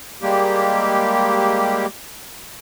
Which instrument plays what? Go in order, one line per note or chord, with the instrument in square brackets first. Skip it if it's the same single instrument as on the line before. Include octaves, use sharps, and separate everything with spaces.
[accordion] G3 G#3 A#3 G4